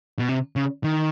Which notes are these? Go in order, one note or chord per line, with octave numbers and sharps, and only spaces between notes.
B2
C3
C#3
D#3